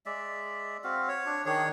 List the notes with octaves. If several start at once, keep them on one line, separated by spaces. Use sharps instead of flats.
G#3 D5 E5
C4 F#4 F5
C#5
D4
D#3 D4 G#4 C#5